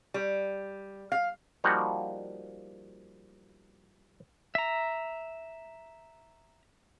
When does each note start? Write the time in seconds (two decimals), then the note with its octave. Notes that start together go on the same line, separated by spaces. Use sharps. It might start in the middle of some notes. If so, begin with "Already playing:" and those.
0.14 G3
1.12 F5
1.64 F3 G3 A#3 D#4 F#4
4.55 E5 A#5